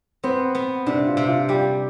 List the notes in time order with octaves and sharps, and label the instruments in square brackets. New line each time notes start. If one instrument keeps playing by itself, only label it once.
[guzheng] B3 [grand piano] C4
[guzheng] B3
[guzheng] C3 [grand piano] D4
[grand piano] F4
[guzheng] C3
[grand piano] F4
[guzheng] G3 [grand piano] G4